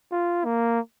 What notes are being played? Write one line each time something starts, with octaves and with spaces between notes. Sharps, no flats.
F4
A#3